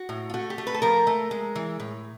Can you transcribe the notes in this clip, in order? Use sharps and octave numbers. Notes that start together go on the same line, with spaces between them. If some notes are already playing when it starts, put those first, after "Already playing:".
Already playing: F#4
A2
F4
A3 F#4
G4
A3
B4
A4
F3 A#4
A3
G#3
E3
A2